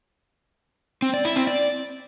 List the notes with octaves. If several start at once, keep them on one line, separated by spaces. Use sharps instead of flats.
C4
D5
E4
C4
D5